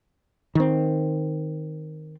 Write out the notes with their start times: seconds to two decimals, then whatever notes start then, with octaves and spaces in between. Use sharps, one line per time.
0.55 D#3 C4